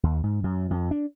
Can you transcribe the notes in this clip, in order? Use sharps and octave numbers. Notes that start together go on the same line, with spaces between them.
D#2
G#2
F#2
F2
D4